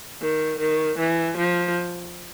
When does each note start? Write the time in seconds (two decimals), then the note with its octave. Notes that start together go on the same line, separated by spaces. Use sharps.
0.21 D#3
0.59 D#3
0.98 E3
1.37 F3